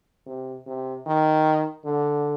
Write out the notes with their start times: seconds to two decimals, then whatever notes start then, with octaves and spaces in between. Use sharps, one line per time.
0.27 C3
0.67 C3
1.07 D#3
1.85 D3